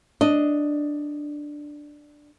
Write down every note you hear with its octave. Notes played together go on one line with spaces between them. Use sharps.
D4 D#5